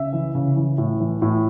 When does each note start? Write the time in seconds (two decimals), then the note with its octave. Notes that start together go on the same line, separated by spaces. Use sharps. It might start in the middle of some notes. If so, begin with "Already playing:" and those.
Already playing: C#3 E5
0.13 E3
0.35 C#3
0.56 E3
0.78 A2
1.00 E3
1.22 A2